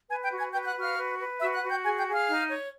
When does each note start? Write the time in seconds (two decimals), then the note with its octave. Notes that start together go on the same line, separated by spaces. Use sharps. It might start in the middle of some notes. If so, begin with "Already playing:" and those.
0.09 B4 G#5 G#6
0.23 G5 G6
0.30 F#4
0.37 G#5 G#6
0.52 B4 G5 G6
0.63 G6
0.66 F#5 F#6
0.75 F#4
0.81 F5 F6
0.97 B4
1.18 B4
1.40 F#4 E5 E6
1.54 F#5 F#6
1.62 F#4
1.70 G5 G6
1.84 G#4 G#5 G#6
1.98 G5 G6
2.06 G#4
2.13 F5 F6
2.28 D#4
2.50 C#5